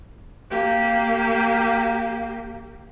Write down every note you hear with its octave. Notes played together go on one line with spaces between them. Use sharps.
A#3 G4